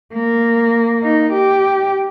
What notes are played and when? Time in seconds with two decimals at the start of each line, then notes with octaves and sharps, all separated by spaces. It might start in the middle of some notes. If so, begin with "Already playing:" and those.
0.14 A#3
1.03 D#4
1.33 G4